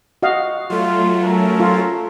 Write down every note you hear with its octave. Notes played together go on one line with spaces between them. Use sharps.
F#4 D#5 F5
F#3 A3 F4
C#4 A4 A#4
F4